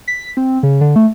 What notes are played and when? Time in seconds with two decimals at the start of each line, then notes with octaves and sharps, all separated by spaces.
0.08 B6
0.37 C4
0.63 C#3
0.81 D3
0.96 A3